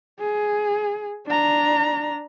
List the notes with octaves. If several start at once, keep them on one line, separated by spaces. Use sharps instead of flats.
G#4
D4 A#5